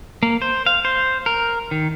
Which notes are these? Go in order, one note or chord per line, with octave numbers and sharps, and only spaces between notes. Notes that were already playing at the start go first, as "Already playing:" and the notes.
A#3
C5
F5
C5
A#4
D#3